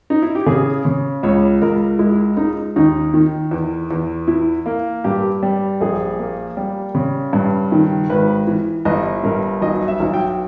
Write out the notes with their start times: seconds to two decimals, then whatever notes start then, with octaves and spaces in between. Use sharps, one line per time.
0.10 D#4
0.22 E4
0.35 G4
0.46 C#3 G#4
0.85 C#3
1.23 C#2 C#5
1.62 C#2 A#4
1.99 G#3 E4
2.37 G#3 D#4
2.76 D#2 D#4
3.14 D#3
3.51 E2
3.91 E2
4.28 E3 E4
4.66 A#3
5.04 G2 G4
5.43 G3
5.81 A#1 G#4
6.19 A#3
6.57 G3
6.95 C#3
7.33 G2
7.72 D#3
8.10 G#1 B4
8.47 E3
8.85 G1 D#5
9.24 G2 A#4
9.62 B1 D#5
9.88 E5
10.00 B1
10.14 G5